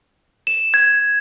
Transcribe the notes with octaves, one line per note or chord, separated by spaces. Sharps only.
E7
G#6